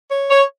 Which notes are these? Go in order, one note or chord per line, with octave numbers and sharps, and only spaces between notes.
C#5
C#5